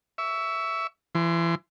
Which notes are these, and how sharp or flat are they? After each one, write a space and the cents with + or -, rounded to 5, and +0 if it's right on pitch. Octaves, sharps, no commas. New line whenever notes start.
E5 +0 C#6 +30
E3 +30 C6 +0